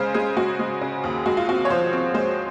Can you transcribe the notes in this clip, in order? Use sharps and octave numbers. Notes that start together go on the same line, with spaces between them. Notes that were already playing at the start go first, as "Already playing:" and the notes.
Already playing: C#3 G#3 C5 F5
G#3 G#4
G#3 F#4
G#3
C#3
D#2
G#3 F#4
F4
C4 F#4
C#5
F3 C5
C4
G#3 C5